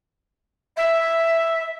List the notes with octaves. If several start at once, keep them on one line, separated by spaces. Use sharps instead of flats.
E5